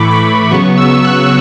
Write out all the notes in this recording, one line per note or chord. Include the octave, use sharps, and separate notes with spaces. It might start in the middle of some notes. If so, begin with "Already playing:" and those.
Already playing: A2 E3 A3 B5 C#6 D6
B5
C#3 F#3 B3 C#6
E6
F#6